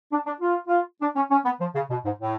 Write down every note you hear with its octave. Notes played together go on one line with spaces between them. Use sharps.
D4
D4
F4
F4
D4
C#4
C#4
B3
F3
C#3
B2
G#2
A2